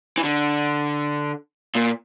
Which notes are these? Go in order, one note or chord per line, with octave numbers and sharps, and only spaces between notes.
E3
D3
A#2